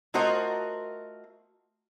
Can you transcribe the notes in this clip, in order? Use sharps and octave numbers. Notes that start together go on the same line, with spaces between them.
A3 F4 F#4 A#4 C5 D#5